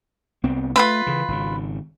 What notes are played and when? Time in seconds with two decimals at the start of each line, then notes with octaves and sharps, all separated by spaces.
0.43 C2 B3 C4
0.76 A3 F4 B4 B5
1.07 C#3 E3
1.28 G#1 C#3